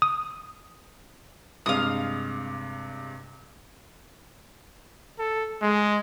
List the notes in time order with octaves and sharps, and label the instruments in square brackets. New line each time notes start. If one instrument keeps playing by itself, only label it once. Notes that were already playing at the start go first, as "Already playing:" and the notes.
[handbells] D#6
[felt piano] G2 C3 G#3 [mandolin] F5 D#6
[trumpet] A4
G#3